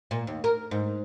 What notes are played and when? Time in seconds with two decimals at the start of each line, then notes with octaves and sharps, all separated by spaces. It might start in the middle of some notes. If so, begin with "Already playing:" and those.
0.11 A#2
0.27 D#2
0.44 A#4
0.71 G#2